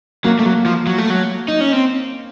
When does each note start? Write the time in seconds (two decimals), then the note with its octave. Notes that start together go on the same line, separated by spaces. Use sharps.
0.24 F#3 A#3
0.39 A3
0.46 F#3
0.66 F3
0.87 F#3
0.98 A3
1.10 F#3
1.48 D#4
1.61 C#4
1.73 C4